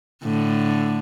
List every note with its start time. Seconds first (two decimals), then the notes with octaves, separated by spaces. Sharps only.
0.23 A2 D3